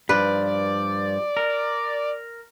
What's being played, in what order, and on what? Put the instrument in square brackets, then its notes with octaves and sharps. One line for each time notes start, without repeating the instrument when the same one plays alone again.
[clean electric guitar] G2 F3 [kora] B4 [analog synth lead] D5
[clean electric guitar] A#4